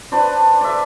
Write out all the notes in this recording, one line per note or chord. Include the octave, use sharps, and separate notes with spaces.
D4 B4 C5
D5 E5